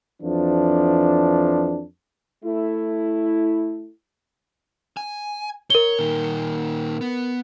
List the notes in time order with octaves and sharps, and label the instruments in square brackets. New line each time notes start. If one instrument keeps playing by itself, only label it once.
[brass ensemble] F2 E3 F3 D4
[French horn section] A3 E4
[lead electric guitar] G#5
[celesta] A#4 G7 [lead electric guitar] C#5
[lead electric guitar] A#2 D#3
B3